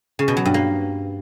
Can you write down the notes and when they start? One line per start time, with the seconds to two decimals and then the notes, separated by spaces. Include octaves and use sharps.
0.19 C#3
0.28 B2
0.37 F#3
0.45 G2
0.54 A#3